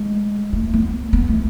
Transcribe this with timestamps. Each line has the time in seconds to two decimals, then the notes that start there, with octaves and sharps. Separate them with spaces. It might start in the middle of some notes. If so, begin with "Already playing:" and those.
Already playing: G#3
0.53 A3
0.74 B3
1.13 B3
1.28 A3